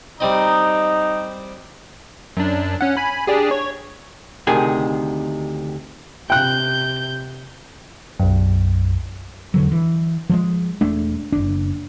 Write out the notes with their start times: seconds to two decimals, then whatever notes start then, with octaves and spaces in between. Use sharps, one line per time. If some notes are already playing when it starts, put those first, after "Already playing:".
0.20 G3 C4 D#4 D#5
2.37 F#2 D4
2.81 C#4 F#5
2.97 G#5 B5
3.27 D4 G4 G#4
3.51 C#5
4.47 D2 C3 D#3 G#4 G#5
6.30 C3 G5 F#6 G6
8.19 B1 F#2
9.54 E1 D3 F#3
9.72 E3
10.30 F3 F#3 G#3
10.81 E1 G#3 A3 D4
11.32 F#1 D4